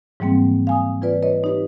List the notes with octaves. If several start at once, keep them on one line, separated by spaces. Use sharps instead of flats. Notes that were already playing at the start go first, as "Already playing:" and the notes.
G#2 E3 F#3 G3 A#3 C4
F5 G#5 D#6
E3 F4 B4 D5
B4 C#5 D#5
D#4 G4 B4